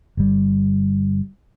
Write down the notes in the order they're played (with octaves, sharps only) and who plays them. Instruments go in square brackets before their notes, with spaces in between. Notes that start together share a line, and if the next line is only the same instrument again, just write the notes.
[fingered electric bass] G1 G3